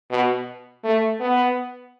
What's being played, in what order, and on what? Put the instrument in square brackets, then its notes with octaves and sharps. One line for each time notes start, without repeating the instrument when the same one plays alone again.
[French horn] B2
A3
B3